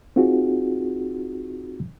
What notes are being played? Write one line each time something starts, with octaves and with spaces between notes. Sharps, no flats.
C4 D#4 F4 F#4 G#4